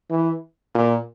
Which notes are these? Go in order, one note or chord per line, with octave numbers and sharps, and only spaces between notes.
E3
A#2